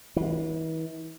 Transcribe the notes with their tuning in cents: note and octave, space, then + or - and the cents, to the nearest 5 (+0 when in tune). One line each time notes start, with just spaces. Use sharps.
E3 -40